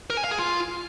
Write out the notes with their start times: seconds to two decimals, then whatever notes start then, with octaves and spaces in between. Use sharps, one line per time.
0.10 A#4
0.17 G#5
0.24 F5
0.31 G#4
0.38 F4